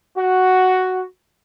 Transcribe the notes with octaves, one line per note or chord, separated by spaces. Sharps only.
F#4